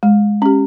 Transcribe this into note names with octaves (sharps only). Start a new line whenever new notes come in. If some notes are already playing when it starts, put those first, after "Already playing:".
G#3
C#4 G4